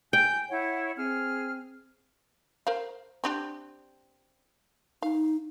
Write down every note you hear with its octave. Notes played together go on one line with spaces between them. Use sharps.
G5 G#5 G6
E4 C#5 F#5
C4 G#4 F6
A#4 C5 F5
C4 D4 G4
D#4 F5